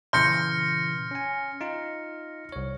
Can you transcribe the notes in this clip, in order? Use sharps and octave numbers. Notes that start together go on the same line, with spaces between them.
A#2 C#3 E3 C6 F6 G6 A#6 C#7
C#4 G#5
D#4 F4
C2 C#5